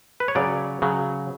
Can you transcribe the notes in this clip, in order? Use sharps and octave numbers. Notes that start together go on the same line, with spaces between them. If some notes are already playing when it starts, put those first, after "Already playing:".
B4
C#5
C#3 F#3 D5
C#3 F#3